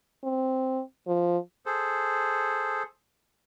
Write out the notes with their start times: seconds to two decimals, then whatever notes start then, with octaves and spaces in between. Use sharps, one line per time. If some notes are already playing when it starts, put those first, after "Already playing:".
0.24 C4
1.07 F3
1.66 G#4 A4 C5